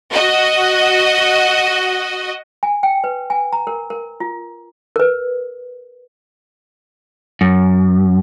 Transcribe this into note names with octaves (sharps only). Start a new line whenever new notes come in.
F#4 D#5
G#5
G5
B4
G#5
A#5
A#4
A#4
F4
A#4 B4
F#2